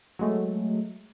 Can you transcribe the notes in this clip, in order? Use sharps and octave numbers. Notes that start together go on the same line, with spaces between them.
F#3 G#3 A3